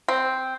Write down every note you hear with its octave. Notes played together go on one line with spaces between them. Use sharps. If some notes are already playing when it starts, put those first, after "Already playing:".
C4